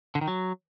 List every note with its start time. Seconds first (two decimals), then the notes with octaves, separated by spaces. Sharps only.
0.15 D3
0.21 D#3
0.28 F#3